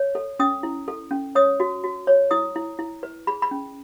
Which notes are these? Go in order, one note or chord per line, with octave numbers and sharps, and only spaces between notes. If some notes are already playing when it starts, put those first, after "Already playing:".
Already playing: C#5
A4
C#4 D#6
E4
A4
C#4
C#5 D#6
F#4
F#4
C#5
E4 D#6
E4
E4
B4
G#4 B5
B5
C#4